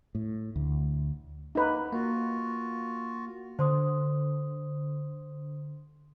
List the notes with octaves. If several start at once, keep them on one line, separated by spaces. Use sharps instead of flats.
A2
D2
A#3 D#4 B4
A#3 F4 F#4
D3 C5 C6 D#6